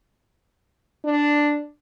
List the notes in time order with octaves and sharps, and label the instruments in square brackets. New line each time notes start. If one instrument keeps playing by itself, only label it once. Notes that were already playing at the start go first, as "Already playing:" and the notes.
[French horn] D4